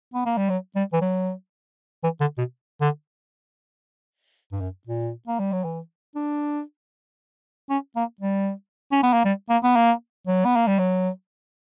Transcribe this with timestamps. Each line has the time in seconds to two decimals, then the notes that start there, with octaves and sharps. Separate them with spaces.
0.14 B3
0.26 A#3
0.37 G3
0.50 F#3
0.75 G3
0.93 E3
1.01 F#3
2.03 E3
2.20 D3
2.38 B2
2.81 D3
4.52 G2
4.61 F#2
4.87 A#2
5.27 A#3
5.39 G3
5.52 F#3
5.64 E3
6.15 D4
7.70 C#4
7.96 A#3
8.21 G3
8.92 C#4
9.03 B3
9.13 A#3
9.25 G3
9.49 A#3
9.63 B3
9.76 A#3
10.27 F#3
10.45 B3
10.56 A#3
10.67 G3
10.79 F#3